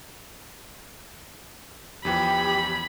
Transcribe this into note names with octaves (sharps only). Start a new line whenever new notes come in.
E2 E3 F3 G4 B5